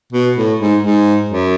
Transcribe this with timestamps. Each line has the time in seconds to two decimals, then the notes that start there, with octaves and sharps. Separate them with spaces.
0.13 B2
0.37 A2
0.60 G#2
0.83 G#2
1.29 F#2